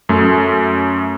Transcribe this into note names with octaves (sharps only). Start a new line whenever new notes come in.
F#2 A3